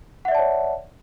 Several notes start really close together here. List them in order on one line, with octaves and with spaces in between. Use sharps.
F#5 E5 D5 A5 C#5